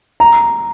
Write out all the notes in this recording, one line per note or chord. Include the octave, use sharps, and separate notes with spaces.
A#5